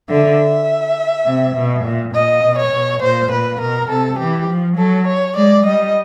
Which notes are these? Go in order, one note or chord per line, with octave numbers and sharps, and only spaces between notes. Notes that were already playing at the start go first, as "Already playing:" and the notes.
D3 E5
C3
B2
A#2
A#2 D#5
B2
C#5
B2
A#2 C5
A#2 B4
B2 A#4
C3 A4
E3 G4
F3
F#3 A4
C#5
G#3 D5
G3 D#5